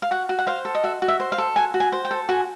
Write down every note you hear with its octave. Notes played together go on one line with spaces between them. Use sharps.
F5
F#4 F#5
F#4
F#5
C5 F5
A4
D#5
F#4 E5
F#4
E5
C5
F5
A4
F#4 G#5
F#4
G#5
C5
G5
A4
F#4 G#5